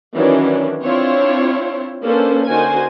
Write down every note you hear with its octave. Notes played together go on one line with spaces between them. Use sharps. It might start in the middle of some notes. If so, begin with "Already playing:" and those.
D#3 E3 F#3 C#4 D4
C4 D4 E4 F4 C5 C#5
A#3 C#4 D4 A4 B4 C5
D3 D#4 F#4 A#4 C5 G#5